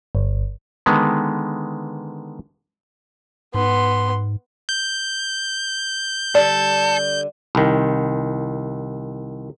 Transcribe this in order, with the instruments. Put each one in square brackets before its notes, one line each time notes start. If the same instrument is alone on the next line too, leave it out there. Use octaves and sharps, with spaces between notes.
[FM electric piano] G1
[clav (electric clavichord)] D3 D#3 G#3 B3
[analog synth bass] G#2 [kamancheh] B3 C6
[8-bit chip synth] G6
[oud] D3 G3 [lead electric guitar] A4 [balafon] D5
[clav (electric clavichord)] C2 D#3